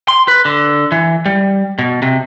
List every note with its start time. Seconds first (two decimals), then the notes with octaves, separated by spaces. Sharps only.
0.08 C6
0.28 B4
0.45 D3
0.92 E3
1.26 G3
1.79 B2
2.02 C3